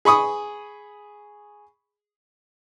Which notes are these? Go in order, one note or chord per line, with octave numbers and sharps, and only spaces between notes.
G#4 B5 C#6 D#6